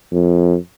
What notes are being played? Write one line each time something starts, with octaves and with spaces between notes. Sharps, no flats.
F2